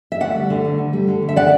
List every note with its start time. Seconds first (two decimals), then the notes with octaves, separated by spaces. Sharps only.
0.12 E5
0.20 D2 D5 F#5
0.35 G3
0.50 D3
0.65 D2
0.78 D2
0.93 G3
1.08 D3
1.22 D2
1.29 E5
1.36 D5 F#5